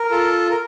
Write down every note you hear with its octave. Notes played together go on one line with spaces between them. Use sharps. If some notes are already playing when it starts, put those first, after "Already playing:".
Already playing: A#4
F4 A4
A#4